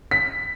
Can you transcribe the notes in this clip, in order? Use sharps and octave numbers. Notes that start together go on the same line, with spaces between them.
B6